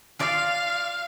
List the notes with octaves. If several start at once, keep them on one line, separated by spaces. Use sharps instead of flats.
F4 D5 F5